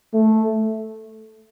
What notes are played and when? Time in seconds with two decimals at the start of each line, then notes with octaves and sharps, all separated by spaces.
0.14 A3